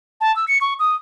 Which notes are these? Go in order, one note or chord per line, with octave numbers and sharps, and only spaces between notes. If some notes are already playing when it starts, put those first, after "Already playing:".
A5
E6
C#7
C#6
D#6